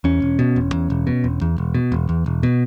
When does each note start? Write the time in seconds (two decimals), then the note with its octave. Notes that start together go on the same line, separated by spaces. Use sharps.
0.04 E2 C#4
0.22 E1
0.39 B2
0.56 E1
0.73 E2
0.90 E1
1.07 B2
1.24 E1
1.41 E2
1.58 E1
1.75 B2
1.92 E1
2.09 E2
2.26 E1
2.43 B2